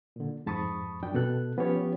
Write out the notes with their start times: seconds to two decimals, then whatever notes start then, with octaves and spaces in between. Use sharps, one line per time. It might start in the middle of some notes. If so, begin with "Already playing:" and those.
0.16 A#2 D3
0.46 F2 G#2 A5 B5 C#6 D#6
1.03 F#2 D4 G5
1.14 B2 A4 F#6
1.57 F3 B3 C#4 F4 G4 C#5